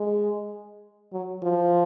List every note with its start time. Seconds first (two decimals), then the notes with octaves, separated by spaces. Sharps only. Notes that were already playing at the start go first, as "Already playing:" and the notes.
Already playing: G#3
1.13 F#3
1.43 F3